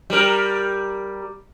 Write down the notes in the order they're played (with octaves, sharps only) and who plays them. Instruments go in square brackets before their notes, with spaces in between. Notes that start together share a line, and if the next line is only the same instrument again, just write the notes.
[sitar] G3 A#4